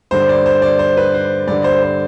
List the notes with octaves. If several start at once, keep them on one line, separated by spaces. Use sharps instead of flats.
G2 D3 C5
D5
C5
D5
C5
B4
C5
G2 D3 D5
C5
C5